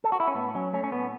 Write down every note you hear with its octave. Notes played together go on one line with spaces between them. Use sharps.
A4
F#4
E4
C#4
A2 B3
F#3 C#4
A3 C#4
C#4
A2 B3